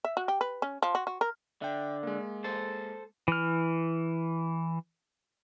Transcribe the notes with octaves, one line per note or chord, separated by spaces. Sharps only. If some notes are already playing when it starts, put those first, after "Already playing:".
E5
F#4
G4
B4
C#4
F3
F#4
F#4
A#4
D3 E5 G5
G#3 A#3
A4 C5
E3 F6